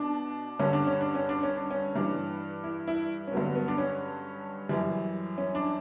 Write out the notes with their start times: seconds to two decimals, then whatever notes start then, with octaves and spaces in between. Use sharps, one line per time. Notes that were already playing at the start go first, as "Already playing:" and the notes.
Already playing: B2 D4
0.59 G2 D3 G3 C#4
0.73 D4
0.87 C#4
1.01 D4
1.15 C#4
1.29 D4
1.43 C#4
1.56 D4
1.71 C#4
1.96 G2 E3 G3 D4
2.64 E4
2.88 E4
3.27 C#4
3.32 G2 D3 F#3 B3
3.55 B3
3.68 D4
3.78 C#4
4.69 F#2 E3 G3
5.38 C#4
5.55 D4